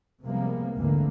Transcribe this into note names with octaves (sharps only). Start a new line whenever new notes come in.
C3 F3 G3 G#3 A#3 B3
G#1 D2 G#2 D3 E3 A#3